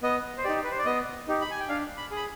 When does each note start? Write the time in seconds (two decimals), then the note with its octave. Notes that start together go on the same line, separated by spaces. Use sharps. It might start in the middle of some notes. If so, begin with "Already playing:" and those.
0.03 B3 D#5
0.38 C5
0.44 D#4 G4 D5
0.64 B4
0.71 C5
0.79 D5
0.85 B3 D#5
1.28 D#4 G4
1.41 B5
1.51 G#5
1.60 G5
1.69 D4 F5
1.97 B5
2.11 G#4
2.16 B5